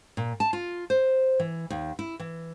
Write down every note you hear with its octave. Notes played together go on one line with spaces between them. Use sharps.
A#2
A5
F4
C5
E3
D#2
E4
E3